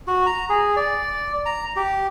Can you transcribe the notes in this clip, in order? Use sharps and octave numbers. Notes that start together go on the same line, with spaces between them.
F#4
A#5
G#4
D5
A#5
G4